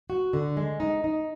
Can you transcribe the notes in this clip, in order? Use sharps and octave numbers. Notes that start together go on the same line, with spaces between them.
F#4
D3
G#3
D#4
D#4